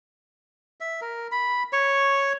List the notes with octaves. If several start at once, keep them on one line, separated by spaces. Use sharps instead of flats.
E5
A#4
B5
C#5 C#6